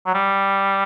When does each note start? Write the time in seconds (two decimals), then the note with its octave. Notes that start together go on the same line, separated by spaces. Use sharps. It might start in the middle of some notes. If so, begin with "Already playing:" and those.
0.06 F#3
0.14 G3